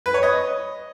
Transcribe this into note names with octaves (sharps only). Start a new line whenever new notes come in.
B4
C#5
D#5